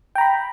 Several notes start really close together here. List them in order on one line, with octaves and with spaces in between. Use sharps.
G5 A#5 B5